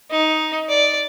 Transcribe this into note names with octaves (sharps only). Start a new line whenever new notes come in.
D#4
D5